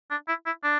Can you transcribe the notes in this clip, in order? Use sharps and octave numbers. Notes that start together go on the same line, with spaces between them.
D4
E4
E4
D4